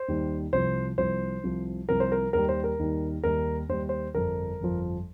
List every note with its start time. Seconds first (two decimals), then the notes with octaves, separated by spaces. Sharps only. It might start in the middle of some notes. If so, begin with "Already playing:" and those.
Already playing: C5
0.08 D#2 D#3 G3
0.53 C2 C3 F3 C5
0.98 C2 C3 F3 C5
1.44 C2 C3 F3
1.88 C2 C3 F3 A#4
2.00 C5
2.12 A#4
2.33 D#2 D#3 G3 A#4
2.49 C5
2.64 A#4
2.79 D#2 D#3 G3
3.24 D#2 D#3 G3 A#4
3.69 D#2 D#3 G3 C5
3.89 C5
4.15 G1 F2 F3 A#4
4.60 G1 F2 F3